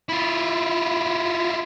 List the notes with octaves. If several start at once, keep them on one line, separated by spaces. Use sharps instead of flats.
E4 F4